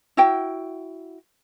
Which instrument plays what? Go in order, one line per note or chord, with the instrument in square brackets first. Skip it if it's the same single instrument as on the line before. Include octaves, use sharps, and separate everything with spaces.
[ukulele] E4 F#4 G5